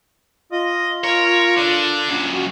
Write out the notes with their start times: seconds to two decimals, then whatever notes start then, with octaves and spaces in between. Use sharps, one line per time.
0.52 F4 D#5
1.04 A#4 C#5
1.57 D3 D4
2.09 F#2 A#2
2.34 F#4